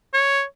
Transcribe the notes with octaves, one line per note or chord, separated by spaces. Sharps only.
C#5